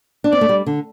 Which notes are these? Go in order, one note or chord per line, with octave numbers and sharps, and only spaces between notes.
D4
C4 D5
A3
G3
D3